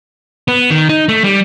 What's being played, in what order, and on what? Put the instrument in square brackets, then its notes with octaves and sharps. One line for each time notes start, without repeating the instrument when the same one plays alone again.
[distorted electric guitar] B3
D#3
D#4
A3
G3